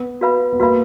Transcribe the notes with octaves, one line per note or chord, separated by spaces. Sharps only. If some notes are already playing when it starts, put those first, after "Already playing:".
Already playing: B3
F#4 B4 F5 B5
B3
A#3 F#4 B4 F5 B5